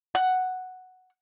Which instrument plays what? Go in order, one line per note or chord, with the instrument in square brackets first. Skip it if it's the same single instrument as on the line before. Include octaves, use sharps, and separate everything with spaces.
[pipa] F#5